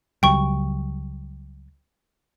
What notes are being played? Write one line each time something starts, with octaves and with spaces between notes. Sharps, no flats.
C#2 F#3 G3 G5 C#6